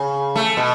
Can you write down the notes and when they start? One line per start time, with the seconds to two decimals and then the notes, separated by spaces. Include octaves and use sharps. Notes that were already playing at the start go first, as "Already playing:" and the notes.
Already playing: C#3
0.36 A3
0.57 B2